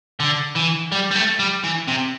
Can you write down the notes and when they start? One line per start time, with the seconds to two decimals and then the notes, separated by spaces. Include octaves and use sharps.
0.20 D3
0.55 E3
0.92 G3
1.11 G3
1.16 A3
1.39 G3
1.64 E3
1.88 C3